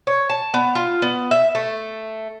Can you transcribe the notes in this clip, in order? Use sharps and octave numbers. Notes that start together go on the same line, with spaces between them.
C#5
A5
B3
F4
B3
E5
A3